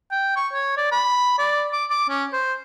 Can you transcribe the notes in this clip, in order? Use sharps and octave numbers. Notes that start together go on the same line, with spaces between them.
G5
C#6
C#5
D5
B5
D5
D6
D6
C#4
C5